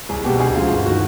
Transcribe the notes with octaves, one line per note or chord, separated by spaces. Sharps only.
C2 G#4
B2 G3 G4
D2 G#4
C#3 F3 G#3 F4
G1
F#4
D#3